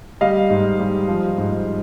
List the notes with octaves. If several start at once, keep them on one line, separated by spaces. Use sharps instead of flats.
G3 D#5 F5
G#2
G3
F3
G#2